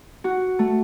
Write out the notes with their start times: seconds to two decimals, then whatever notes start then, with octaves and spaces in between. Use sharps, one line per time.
0.24 F#4
0.59 A3